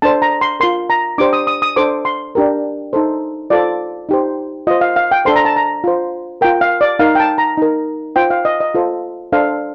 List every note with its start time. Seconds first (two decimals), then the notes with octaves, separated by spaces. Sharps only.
0.02 D4 A4 C5 A5
0.22 A#5
0.41 C6
0.60 F4 A#4 C6
0.90 A#5
1.18 D4 G4 C5 D6
1.33 D#6
1.47 D#6
1.62 D#6
1.76 D4 A4 C5 D6
2.05 C6
2.35 D4 G4 A#4
2.93 D#4 A4 C5
3.50 F4 A4 C5 D5
4.09 D#4 G4 C5
4.67 F4 C5 D#5
4.81 F5
4.96 F5
5.11 G5
5.25 D4 A4 C5 C6
5.36 A#5
5.45 A5
5.56 A#5
5.84 F4 C5
6.41 F4 A#4 G5
6.61 F5
6.81 D5
6.99 D#4 A#4 F5
7.15 G5
7.20 A5
7.38 A#5
7.57 D#4 A#4
8.16 F4 C5 G5
8.30 F5
8.45 D#5
8.60 D#5
8.75 F4 A4 C5
9.32 D4 A4 C5 F5